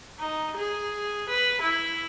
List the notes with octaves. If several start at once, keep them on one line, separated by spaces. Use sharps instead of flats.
D#4
G#4
B4
E4